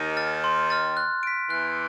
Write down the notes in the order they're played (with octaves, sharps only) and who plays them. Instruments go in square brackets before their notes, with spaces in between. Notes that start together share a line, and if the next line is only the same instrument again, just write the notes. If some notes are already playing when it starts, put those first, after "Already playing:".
Already playing: [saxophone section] D#2 D#3
[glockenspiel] F6 A6
C6
F6 A6
F#6
B6 D7
[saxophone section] E2 E3 [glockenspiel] F#6